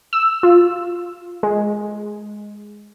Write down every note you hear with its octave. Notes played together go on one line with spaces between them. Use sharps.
E6
F4
G#3